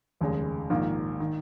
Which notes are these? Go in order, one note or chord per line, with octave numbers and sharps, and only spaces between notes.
F1 D#2 C#3 G#3
A#1 G#2 D#3 A#3 F4
D#3